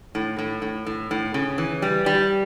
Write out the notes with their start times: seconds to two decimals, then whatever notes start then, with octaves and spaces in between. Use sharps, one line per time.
0.15 A2
0.39 A2
0.62 A2
0.86 A2
1.11 A2
1.34 C#3
1.58 E3
1.82 G3
2.06 G3